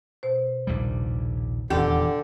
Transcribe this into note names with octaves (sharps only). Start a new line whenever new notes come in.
B2 C5
A#1 D#2 C3 G3
D#1 E2 D3 G4 F#5